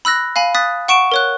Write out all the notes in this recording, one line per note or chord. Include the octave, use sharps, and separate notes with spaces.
B5 E6 F#6 A#6
F5 G#5 B5
D#6 F#6 A6 B6
F#5 C#6 D7 E7
A#4 C#5 F#6